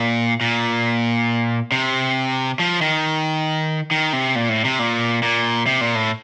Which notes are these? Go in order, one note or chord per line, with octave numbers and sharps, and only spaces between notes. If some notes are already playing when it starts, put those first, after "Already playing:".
Already playing: A#2
A#2
C3
F3
D#3
D#3
C3
A#2
A2
C3
A#2
A#2
C3
A#2
A2